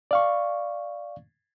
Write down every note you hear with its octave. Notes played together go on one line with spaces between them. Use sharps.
D5 F5 C#6